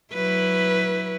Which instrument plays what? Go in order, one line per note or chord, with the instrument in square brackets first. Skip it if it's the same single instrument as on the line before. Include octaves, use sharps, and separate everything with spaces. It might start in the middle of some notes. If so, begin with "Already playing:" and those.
[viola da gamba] F#3 E4 B4